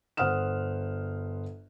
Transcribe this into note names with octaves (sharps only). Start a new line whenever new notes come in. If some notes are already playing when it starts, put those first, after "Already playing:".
G1 C5 F#5 D#6 F6 E7